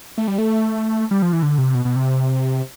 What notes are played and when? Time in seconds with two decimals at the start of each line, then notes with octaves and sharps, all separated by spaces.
0.18 A3
0.28 G3
0.38 A3
1.11 G3
1.22 F3
1.33 E3
1.43 D3
1.58 C3
1.75 B2
1.85 B2
1.96 C3